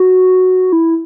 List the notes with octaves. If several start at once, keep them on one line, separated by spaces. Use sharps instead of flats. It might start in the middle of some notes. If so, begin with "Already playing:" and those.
Already playing: F#4
E4